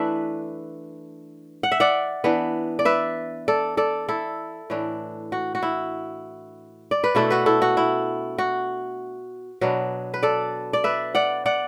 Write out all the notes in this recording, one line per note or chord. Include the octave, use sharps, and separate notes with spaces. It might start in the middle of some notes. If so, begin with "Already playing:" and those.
Already playing: E3 A3 D4 B4 E5
F#5
E5
D5 F#5
E3 B3 D4
D5
B4 E5
A4 D5
A4 D5
E4 A4
A2 E3 D4
F#4
F#4
E4
D5
B4
B2 A3 D4 E4 A4
F#4 B4
E4 A4
F#4
E4
F#4
B2 F#3 B3 D4
B4
A4 D5
D5
B4 E5
D5 F#5
D5 F#5